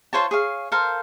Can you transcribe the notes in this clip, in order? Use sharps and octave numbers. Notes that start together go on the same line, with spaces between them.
F4 C5 C#5 A5
G#4 C#5 F5
A4 A#4 C5 F5